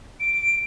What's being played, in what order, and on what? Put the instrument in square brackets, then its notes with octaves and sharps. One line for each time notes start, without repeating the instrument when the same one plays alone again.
[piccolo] D7